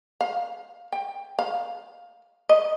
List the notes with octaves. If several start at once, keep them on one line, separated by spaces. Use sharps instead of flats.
F5
G5
F5
D#5